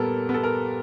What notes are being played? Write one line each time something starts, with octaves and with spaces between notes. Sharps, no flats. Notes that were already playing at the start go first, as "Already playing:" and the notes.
Already playing: A#2 G3 B3 A4 A#4
B3
A4
A#4